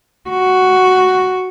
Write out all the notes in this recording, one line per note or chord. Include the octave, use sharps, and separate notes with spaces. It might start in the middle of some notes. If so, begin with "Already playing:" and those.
F#4